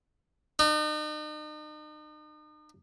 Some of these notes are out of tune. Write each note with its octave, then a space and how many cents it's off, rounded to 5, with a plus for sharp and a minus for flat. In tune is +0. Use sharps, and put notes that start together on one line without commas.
D#4 -40